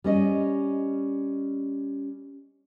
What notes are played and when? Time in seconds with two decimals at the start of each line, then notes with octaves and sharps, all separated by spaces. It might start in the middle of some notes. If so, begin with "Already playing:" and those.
0.04 G3 C#4 D#5